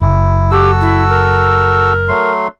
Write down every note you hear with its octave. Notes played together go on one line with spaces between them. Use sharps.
F#1 E4
F#4 G4 A4 E6
E4
A#4
F#3 A3 C6